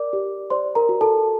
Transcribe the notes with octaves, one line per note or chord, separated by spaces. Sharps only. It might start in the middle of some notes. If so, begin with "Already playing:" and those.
Already playing: A#4 D5 D6
G4
C5 D5 C6
A#4 A#5
F#4
A4 A5